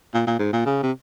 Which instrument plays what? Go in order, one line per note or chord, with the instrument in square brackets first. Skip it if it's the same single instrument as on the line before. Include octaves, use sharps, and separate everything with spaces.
[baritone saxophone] A#2
A#2
G#2
A#2
C#3
C3